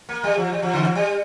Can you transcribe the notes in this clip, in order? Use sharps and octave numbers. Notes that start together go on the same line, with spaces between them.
A#3
G3
F3
G3
F3
D3
F3
G3